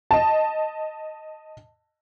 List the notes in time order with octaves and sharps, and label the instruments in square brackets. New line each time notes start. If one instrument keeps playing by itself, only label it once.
[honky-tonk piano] D#5 A5